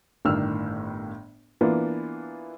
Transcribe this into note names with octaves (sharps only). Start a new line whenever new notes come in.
G1 A2 D#3 D4 E6 F6
E3 A#3 B3 D4 E4 F4